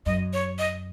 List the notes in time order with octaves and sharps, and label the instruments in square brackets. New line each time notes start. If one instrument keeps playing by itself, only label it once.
[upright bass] F#2 [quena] D#5
[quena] C#5
D#5